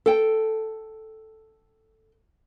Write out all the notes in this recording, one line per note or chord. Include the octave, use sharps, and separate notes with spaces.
A4 G5